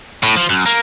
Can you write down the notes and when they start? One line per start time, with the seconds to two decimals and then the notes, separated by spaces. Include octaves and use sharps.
0.23 A2
0.37 F3
0.50 F#2
0.66 A#3